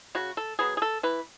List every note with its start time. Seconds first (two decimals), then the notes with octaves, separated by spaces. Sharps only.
0.15 C#3 F#4
0.37 A4
0.59 F#3 B3 G#4
0.77 G#4
0.82 A4
1.03 E3 B4